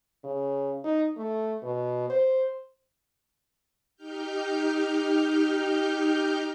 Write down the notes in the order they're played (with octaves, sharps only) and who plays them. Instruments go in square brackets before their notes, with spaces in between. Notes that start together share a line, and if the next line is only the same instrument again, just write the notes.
[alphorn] C#3
D#4
A3
B2
C5
[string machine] D#4 G4 F6 G6